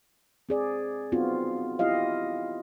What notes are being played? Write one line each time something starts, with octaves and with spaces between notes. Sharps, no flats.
C4 G#4 D5
B3 C4 D#4 F4 F#4
E4 F4 G4 D#5 F5